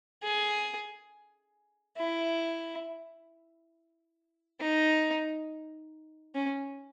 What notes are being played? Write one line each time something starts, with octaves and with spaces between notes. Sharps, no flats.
G#4
E4
D#4
C#4